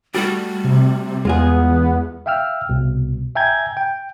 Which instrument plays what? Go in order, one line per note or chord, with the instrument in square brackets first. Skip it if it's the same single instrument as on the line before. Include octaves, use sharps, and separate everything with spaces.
[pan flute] G3 [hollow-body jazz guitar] A3 F#4 G4
[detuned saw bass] C3
[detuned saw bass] E2 [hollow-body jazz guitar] G#3 F4 G#4 [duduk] B3
[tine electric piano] E5 F5 G5 E6 F6
C2 B2
E5 G5 G#5 A#5 G6 G#6
G5